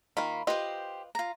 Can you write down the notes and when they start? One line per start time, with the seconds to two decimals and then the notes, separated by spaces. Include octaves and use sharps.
0.17 D#3 A#3 F4 B5
0.47 F4 G4 B4 C5 D#5
1.15 F4 A#5